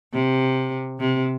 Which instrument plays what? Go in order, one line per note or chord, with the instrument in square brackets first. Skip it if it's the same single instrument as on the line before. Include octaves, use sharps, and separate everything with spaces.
[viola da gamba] C3
C3